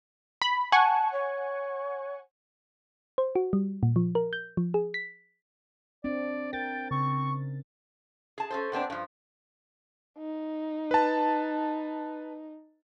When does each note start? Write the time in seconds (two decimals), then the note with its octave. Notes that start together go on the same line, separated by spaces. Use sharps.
0.42 B5
0.72 F#5 G#5 A5 C#6
1.12 C#5
3.18 C5
3.35 F#4
3.53 G3
3.83 A#2
3.96 F3
4.15 A#4
4.33 G6
4.57 F3
4.74 G#4
4.94 B6
6.04 C4 D4 D5
6.53 A#4 G5 A6
6.91 C#3 C4 C#6
8.38 G#4 A5
8.50 C#4 A4 C5
8.72 G#2 B3 C4 D4
8.90 G2 F3
10.18 D#4
10.91 B4 A5